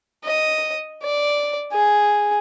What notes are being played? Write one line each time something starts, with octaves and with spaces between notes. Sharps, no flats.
D#5
D5
G#4